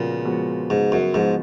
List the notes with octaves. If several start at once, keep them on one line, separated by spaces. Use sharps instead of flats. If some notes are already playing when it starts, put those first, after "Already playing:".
Already playing: A#2 C#3 F3 G#3 B3 F#4
F3 G#3 B3 F#4
G#2 C#3
F#2
G#2 F3 G#3 B3 F#4